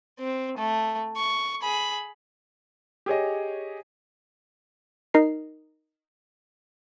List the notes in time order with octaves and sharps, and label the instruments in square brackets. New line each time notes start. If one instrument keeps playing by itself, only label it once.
[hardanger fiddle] C4
A3
C#6
G#4 B5
[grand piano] G4 G#4 C#5 D#5
[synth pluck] D#4 A#4 C7